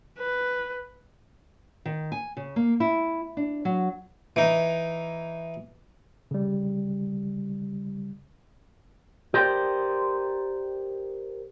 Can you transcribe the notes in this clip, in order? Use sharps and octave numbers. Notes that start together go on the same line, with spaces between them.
B4
D#3
G#5
C#3
A#3
E4
D4
F#3
E3 D#4
C#3 G3
G4 A#4 C5 D5 G5